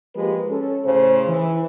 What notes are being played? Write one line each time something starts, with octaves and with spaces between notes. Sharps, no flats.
F3 G#3 A#3 G4 B4
C#4 A4
A2 C#3 C5
E3